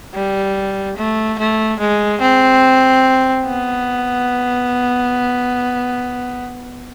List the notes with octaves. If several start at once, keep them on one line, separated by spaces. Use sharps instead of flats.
G3
A3
A3
G#3
C4
B3